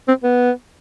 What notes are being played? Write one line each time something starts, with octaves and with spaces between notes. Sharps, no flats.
C4
B3